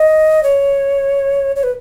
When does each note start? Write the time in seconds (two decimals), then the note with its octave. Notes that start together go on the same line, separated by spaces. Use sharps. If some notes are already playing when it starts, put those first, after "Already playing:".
Already playing: D#5
0.43 C#5
1.56 C#5
1.63 B4